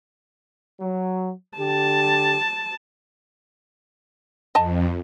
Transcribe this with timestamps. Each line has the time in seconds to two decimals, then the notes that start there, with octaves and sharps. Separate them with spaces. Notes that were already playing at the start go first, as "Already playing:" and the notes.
0.80 F#3
1.58 D3 G4 A5
4.55 F2 D#5 G#5 A5